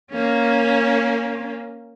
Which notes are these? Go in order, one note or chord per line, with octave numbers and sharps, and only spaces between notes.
A#3 C#4